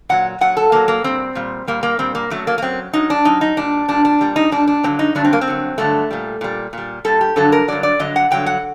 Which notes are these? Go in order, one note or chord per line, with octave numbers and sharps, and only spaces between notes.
A#2 F#3 F#5
A#2 F#3 F#5
A4
A#2 F#3 A#3
A#3
A#2 G3 C4
A#2 G3
A#2 G3 A#3
A#3
A#2 G3 C4
A#3
F#2 F#3 A3
A#3
A#3
F#2 F#3 C4
F#2 F#3 D#4
D4
F#2 F#3 D#4
D#4
A#2 G3 D4
A#2 G3 D4
D4
A#2 G3
D#4
A#2 G3 D4
D4
G2 D3 F#3 C4
D#4
G2 D3 F#3 D4
C4
A#3
C4
G2 D3 F#3
G2 D3 F#3 A3
A#2 G3
A#2 G3
A#2 G3
A#2 G3 A4
G4
G2 D3 F#3 A4
A#4
G2 D3 F#3 D5
D5
G2 D3 F#3 D#5
F#5
G2 D3 F#3 G5
F#5